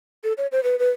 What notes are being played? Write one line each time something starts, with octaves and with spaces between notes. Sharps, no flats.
A4
C#5
C5
B4
B4